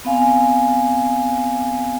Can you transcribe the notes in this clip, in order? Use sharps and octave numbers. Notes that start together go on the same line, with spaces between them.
B3 C4 F5 G#5